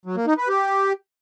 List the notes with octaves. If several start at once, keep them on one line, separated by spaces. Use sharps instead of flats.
F#3
A#3
D#4
B4
G4